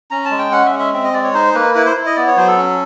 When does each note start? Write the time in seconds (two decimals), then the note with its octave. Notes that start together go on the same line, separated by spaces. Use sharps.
0.11 C#4 A#5
0.25 A5
0.31 G#3
0.39 G5
0.52 C#4 F#5
0.66 E5
0.72 G#3
0.79 E5
0.93 C4 E5
1.04 D#5
1.13 G#3 D5
1.24 C#5
1.34 D#4 C5
1.55 A#3 B4
1.75 E4 B4
1.86 C5
1.96 E4
2.06 D#5
2.16 B3 D5
2.27 C#5
2.37 F#3 C5
2.47 A4
2.57 C#4